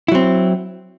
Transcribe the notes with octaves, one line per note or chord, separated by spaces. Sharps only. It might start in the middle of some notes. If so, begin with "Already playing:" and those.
F#3 C4 E4